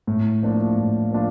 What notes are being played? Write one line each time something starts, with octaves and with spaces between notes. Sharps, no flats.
A2
F3 A#3 D4 F4
A2
F3 A#3 D4 F4